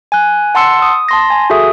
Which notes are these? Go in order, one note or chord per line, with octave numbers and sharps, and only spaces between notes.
G#5 F#6
F#5 A5 C6 E6 C#7
D#6
A5 C6 A#6
G#5
F#4 G#4 A4 E5 D#6